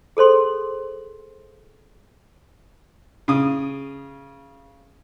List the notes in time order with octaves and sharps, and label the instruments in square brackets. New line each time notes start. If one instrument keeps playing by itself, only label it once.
[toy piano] G#4 A4 C5 C6
[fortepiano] C#3 D#6